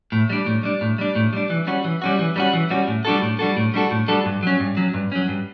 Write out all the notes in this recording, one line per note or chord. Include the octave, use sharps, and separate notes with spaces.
A2
G3 D4
A2
G3 D4
A2
G3 D4
A2
G3 D4
E3
G3 C#4 F#4
E3
G3 C#4 F#4
E3
G3 C#4 F#4
E3
G3 C#4 F#4
A2
G3 D4 F#4 A4
A2
G3 D4 F#4 A4
A2
G3 D4 F#4 A4
A2
G3 D4 F#4 A4
G2
F#3 C#4
G2
F#3 C#4
G2
F#3 C#4
G2